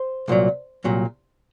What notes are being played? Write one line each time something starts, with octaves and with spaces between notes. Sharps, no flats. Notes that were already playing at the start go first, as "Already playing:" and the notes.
Already playing: C5
C2 A#2 F#3
C2 A#2 F#3